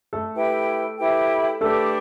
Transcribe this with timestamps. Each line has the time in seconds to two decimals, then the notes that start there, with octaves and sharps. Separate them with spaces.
0.13 A3 A4
0.34 E4 G4 B4 G5
0.97 E4 G4 B4 G5
1.61 A3 D4 G4 A4 B4